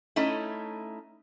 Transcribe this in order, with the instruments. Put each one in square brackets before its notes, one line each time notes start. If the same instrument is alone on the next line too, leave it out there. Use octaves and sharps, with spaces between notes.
[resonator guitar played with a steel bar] A3 C#4 D#4 E4